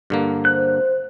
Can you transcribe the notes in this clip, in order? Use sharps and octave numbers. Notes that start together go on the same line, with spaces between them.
G2 D3 A#3
C5 F#6